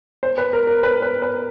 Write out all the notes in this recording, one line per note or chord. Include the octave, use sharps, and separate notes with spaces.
C5
B4
A#4
A#4
B4
B4
B4